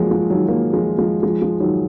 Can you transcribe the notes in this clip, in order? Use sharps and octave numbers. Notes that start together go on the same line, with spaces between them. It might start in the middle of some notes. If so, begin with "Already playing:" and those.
Already playing: F3 F#3 G#3 A#3
F3 G#3
D#3 F#3
F#3 A#3
F3 G#3
F3 G#3
F3 G#3
F3 G#3
D#3 F#3